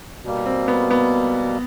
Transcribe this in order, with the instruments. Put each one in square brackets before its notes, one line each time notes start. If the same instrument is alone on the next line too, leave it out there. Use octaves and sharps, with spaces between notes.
[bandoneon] B2 G3 A#3
[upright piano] C4
B3
B3